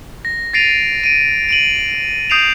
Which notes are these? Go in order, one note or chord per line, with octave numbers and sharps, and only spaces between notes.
A#6
A6 A#6 C7 D7 D#7 F7
D7 D#7
D7 D#7 F#7
D#6 G6 C7 D7 E7 F7